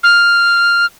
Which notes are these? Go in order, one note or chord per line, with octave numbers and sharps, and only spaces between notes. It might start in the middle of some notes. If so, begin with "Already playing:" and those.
F6